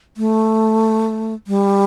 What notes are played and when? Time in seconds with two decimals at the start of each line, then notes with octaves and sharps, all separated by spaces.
0.17 A3
1.47 G3